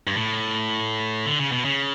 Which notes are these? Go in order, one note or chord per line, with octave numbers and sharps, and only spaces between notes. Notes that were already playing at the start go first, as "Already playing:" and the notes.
G2
A2
D3
C#3
B2
C#3